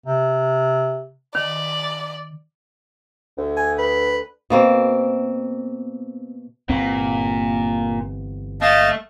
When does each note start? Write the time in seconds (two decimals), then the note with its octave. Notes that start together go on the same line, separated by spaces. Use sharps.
0.06 C3
1.35 D#3 D5
3.38 D2
3.57 G#5
3.78 B4
4.50 B2 A#3 C4
6.69 G1 A#2 E3 C4
8.62 A3 D#5 F5 A5